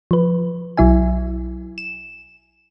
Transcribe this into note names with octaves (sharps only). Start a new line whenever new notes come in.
F3 B4
B1 F#3 E4 E5 G#5
E7